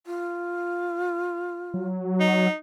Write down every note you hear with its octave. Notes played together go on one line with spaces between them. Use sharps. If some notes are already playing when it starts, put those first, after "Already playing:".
F4
F#3
D#4